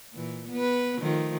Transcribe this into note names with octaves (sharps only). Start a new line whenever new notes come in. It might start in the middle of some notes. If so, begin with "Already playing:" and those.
A#2 E3
B3 B4
D#3 F3 A3